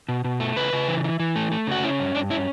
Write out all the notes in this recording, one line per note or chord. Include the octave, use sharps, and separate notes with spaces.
B2
B2
A3
C#3 B4
C#3
E3
E3
E3
A3
A3
C#3 F#4
C#4 E4
G2
G2 D4
C#4 E4